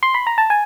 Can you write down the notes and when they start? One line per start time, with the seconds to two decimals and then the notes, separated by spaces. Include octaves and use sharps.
0.03 C6
0.14 B5
0.27 A#5
0.38 A5
0.50 G#5